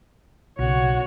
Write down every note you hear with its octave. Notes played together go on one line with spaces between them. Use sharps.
B1 C#3 F#4 C#5